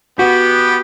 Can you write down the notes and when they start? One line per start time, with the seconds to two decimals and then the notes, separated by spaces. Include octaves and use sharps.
0.19 B3 F#4 G4